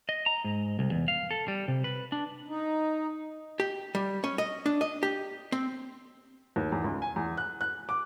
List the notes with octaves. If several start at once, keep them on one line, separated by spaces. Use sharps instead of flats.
D#5
A#5
G#2
C2
E2
F5
A4
G3
C3
B4
D4
D#4
G4
G3
C#4
D#5
D4
D#5
G4
C4
D#2
E2
C#2
G#5
E2
F#6
F#6
D6